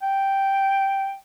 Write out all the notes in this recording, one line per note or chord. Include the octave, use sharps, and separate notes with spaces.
G5